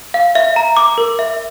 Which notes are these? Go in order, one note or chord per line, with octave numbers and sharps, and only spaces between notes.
F5
E5
A#5
D6
A#4
E5